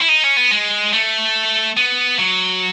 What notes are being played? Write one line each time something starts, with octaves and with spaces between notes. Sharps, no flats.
E4
D#4
C#4
B3
G#3
A3
B3
F#3